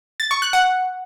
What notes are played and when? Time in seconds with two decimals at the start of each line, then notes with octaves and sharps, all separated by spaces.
0.20 A6
0.31 C#6
0.42 F#6
0.53 F#5